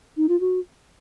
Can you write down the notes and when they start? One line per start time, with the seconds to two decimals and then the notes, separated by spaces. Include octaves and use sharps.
0.17 D#4
0.29 F4
0.40 F#4